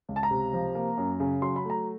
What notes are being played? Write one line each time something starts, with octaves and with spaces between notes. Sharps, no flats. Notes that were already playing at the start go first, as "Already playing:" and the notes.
C#2
A5
A#5
C3
F3
A#3
F#2
C#3
F#3 C6
B5
A3 A#5